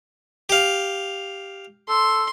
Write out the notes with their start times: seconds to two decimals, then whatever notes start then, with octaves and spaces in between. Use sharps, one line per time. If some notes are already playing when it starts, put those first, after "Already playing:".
0.49 G4 F5
1.89 A4 C6